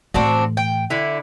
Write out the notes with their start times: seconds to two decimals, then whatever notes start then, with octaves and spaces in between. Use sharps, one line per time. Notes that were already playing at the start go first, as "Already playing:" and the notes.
0.14 A2 E3 C4 D4 F#4
0.57 G5
0.90 D3 E4